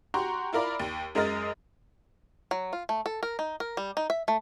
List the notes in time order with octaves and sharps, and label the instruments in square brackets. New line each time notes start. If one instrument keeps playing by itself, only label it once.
[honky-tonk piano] F#4 G4 F#5 A#5 C6 C#6
E4 F4 A#4 D5 B5
D#2
F#2 G#3 A#4 D#5 F6 A6
[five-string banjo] F#3
F4
A3
A4
A#4
D#4
A#4
G3
D#4
E5
A3